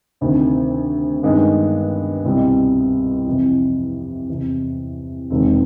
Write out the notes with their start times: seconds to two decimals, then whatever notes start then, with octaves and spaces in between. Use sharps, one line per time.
0.21 D2 C3 D#3
1.23 G2 D#3 G#3 B3 D#4
2.25 C2 B2 G3 C4
3.27 F2 C3 E3
4.29 E2 C3 E3
5.30 E1 D#2 D#3 G#3 C4